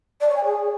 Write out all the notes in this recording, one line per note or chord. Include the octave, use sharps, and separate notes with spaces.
D5
C#5
G#5
G#4